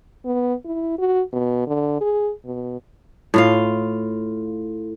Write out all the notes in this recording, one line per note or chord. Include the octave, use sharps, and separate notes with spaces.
B3
E4
F#4
B2
D3
G#4
B2
A2 F4 F5